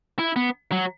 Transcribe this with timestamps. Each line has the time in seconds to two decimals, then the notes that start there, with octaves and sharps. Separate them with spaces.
0.19 E4
0.36 B3
0.72 F#3